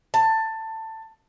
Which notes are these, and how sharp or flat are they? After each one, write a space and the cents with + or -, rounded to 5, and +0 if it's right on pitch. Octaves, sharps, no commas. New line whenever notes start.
A5 +15